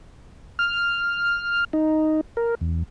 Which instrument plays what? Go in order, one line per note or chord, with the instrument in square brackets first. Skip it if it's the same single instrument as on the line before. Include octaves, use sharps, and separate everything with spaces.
[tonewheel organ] F6
D#4
A#4
E2